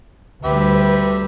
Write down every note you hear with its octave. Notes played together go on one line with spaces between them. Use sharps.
D2 G3 G4 B4 E5